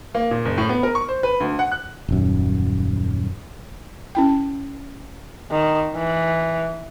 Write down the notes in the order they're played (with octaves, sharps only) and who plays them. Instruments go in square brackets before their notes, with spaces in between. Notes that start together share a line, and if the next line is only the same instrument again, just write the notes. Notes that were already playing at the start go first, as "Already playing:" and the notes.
[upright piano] A#3
A#2
F#1
A2
B3
A#4
C#6
C5
B4
D2
F#5
F#6
[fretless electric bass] D#1 F#2
[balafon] C#4 E4 G5
[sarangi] D#3
E3